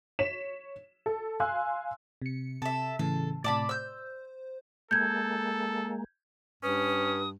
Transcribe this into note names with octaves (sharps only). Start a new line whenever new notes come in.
C#5 B6 E7
A4
F5 G#5 C6 E6 F#6
C3 C#7
C3 A4 E5
A2 C#3 E3 A4
A2 C3 D5 A5 B5
C5 E6 G6
G#3 A#3 A4 G6 G#6
G2 C#4 B4 D#6